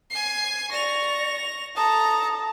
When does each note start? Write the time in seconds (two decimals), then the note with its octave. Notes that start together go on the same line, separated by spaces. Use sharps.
0.10 G#5 C7
0.72 D5 C#6 A#6 F7
1.76 A4 A5 A#5 D#6